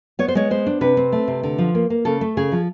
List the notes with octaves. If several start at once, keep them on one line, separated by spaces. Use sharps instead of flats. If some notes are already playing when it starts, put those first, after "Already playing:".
B3 C#5
C5
G#3 C#5
B3 C5
D4
C3 B4
C4
A3
C3
D3
F3
A#3
A#3
C#3 A4
A3
C#3 G#4
F3